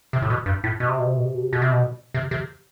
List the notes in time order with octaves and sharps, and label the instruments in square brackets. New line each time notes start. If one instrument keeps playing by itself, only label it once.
[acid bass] C3
A2
B2
G2
A2
B2
C3
B2
C3
B2
C3
B2
C3
B2
C3
B2
C3
C3